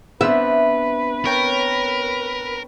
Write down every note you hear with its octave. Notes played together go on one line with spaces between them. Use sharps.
B3 C4 D4 B4 E5
A#4 C#5 G5 A6